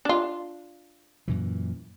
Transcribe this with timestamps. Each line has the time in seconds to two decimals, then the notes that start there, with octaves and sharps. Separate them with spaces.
0.05 D4 F4
1.28 F#2 A#2 E3